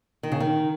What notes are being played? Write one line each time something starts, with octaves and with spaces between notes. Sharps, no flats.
D#3
C#3
D#3